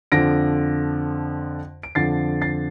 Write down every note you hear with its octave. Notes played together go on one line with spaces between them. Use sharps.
F2 D3 F3 A#6 D7
D7
F2 D3 F3 A6 C7
A6 C7